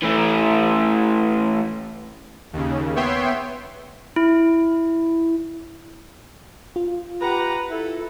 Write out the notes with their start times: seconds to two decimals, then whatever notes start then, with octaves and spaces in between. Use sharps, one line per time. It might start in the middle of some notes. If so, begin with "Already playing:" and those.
0.02 E3 A3
2.53 D#2 C#3
2.96 B3 C#5 E5 G5 C6
4.16 E4
6.76 F4
7.21 G4 B4 F#5 A#5
7.70 E4 A4